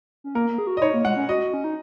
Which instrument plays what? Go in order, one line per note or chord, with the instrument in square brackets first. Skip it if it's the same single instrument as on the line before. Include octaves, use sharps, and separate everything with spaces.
[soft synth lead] C#4
[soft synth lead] A#3 [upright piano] A#4
[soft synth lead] A#3
G#4
F#4
[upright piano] D#5
[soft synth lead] D#4 [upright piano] C#5
[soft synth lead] A#3
[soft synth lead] G#3 [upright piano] F#5
[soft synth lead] C#4
[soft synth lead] F#4 [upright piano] D#5
[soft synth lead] C#4
D#4